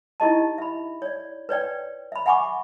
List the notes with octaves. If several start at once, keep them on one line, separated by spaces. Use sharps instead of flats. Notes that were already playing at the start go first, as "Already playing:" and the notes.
D#4 E4 G4 D#5 A5
E5 B5
C#5 D5
B4 C#5 D5 G5
E5 B5
E5 F#5 G#5 B5 C#6 D6